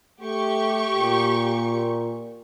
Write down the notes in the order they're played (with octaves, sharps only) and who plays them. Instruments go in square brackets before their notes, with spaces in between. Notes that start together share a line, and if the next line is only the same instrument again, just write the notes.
[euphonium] A3 [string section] G4 C#6
[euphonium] A#2